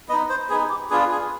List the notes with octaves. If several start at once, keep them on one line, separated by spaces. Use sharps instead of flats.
B3 D#4 D#5
C5
B3 D#4 G#4
G4
B3 D4 F4 G#4
G#4